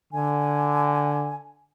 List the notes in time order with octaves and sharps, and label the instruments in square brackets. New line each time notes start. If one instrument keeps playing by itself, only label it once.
[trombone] D3 [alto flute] G#5